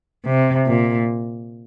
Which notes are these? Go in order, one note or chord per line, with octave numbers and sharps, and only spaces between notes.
C3
A#2